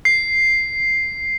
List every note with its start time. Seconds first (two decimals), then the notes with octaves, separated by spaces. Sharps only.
0.05 C7